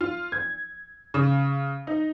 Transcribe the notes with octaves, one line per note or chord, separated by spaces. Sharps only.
F4
G#6
C#3
D#4